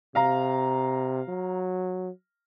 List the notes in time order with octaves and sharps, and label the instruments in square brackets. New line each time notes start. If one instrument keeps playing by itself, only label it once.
[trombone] C3 [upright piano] F5 A#5
[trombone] F#3